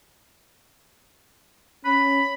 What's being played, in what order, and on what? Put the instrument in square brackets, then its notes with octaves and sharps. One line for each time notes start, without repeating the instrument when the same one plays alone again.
[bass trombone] C#4 [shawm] B5